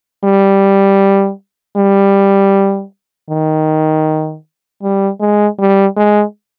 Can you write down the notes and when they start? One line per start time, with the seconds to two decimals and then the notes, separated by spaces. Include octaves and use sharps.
0.24 G3
1.77 G3
3.29 D#3
4.83 G3
5.20 G#3
5.59 G3
5.96 G#3